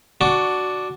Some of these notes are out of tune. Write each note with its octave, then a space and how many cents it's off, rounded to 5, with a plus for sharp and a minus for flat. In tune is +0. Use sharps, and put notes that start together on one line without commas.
D4 +0 F#4 +5 C#6 +20